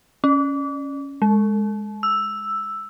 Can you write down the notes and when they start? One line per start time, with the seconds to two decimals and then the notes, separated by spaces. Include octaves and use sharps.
0.24 C#4
1.22 G#3
2.03 E6